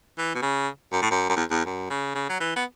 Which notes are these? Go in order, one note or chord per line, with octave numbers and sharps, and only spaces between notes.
E3
B2
C#3
F#2
A2
F#2
F#2
E2
E2
F#2
C#3
C#3
F#3
E3
B3